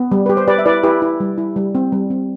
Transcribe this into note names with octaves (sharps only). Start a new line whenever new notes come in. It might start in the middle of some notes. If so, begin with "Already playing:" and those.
Already playing: B3
G3
G4 B4
C5
G4 B4 D5
E5
E4 B4 D5
E4 G4 B4
E4
G3
E4
G3
C4
G3
C4